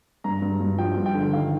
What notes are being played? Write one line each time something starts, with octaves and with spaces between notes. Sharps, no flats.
G2 A#5
G2
G2
F3 G5
G2
G5
D3
D#3 F5